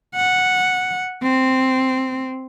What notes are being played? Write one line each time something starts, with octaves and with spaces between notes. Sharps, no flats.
F#5
C4